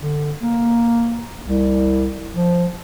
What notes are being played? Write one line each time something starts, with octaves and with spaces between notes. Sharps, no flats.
D3
A#3
C2
F3